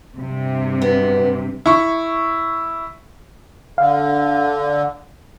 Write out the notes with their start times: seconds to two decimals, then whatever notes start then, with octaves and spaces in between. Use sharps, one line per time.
0.17 G2 C3
0.82 B3
1.66 E4 C#6
3.78 D3 F5